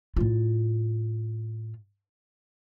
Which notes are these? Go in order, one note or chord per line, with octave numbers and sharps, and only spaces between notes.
A2 F4